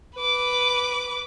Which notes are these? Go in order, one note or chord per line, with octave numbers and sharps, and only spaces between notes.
B4 D6